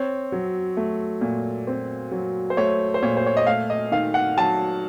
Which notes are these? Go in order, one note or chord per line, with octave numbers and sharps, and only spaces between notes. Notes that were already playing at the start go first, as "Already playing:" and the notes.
Already playing: C4 C#5
F#3
A3
A#2
C4
F#3
C5
A3 C#5
C5
A#2 C#5
C5
C#5
D#5
A3 F5
D#5
D#3 F5
F#5
F#3 A5